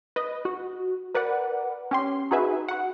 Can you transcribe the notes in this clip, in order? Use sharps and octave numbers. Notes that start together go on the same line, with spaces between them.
B4 D#5
F#4
A#4 B4 D5 F#5
C#4 G4 C6
D#4 F#4 G#4 B4 E5
F#4 F#5